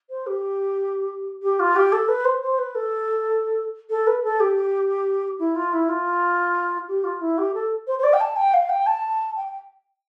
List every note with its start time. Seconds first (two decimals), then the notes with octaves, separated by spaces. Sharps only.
0.10 C5
0.26 G4
1.42 G4
1.59 F4
1.75 G4
1.92 A4
2.08 B4
2.25 C5
2.41 C5
2.58 B4
2.75 A4
3.90 A4
4.07 B4
4.23 A4
4.40 G4
5.39 E4
5.55 F4
5.73 E4
5.88 F4
6.88 G4
7.04 F4
7.20 E4
7.38 G4
7.54 A4
7.87 C5
7.98 C5
8.03 D5
8.13 G5
8.20 A5
8.36 G5
8.53 F5
8.69 G5
8.86 A5
9.36 G5